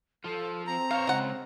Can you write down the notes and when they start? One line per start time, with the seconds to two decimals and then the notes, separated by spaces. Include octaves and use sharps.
0.24 F3 F4 A4
0.67 C4 A#5
0.91 C5 C#5 F5
1.07 C#3 G#3 D#5 F#5